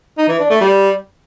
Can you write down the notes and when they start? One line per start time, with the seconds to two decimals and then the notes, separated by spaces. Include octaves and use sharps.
0.18 D#4
0.28 E3
0.39 D4
0.50 A3
0.61 G3